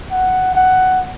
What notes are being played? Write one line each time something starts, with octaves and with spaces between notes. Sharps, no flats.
F#5
F#5